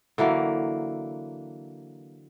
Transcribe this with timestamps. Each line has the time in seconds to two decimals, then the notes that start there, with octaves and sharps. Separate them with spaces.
0.18 D3 E3 F#3 A#3